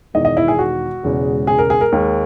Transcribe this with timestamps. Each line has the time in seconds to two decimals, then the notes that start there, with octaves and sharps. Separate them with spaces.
0.14 E1 E2 D#3 D#5
0.25 D#5
0.37 E4
0.48 G#4
0.59 F#4
1.03 E1 E2 C#3 G#3
1.47 G#4
1.58 A#4
1.70 G#4
1.81 A#4
1.92 D#2 D#3 G#3